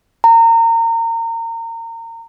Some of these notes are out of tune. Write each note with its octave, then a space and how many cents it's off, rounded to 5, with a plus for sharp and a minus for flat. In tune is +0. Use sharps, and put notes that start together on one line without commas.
A#5 -30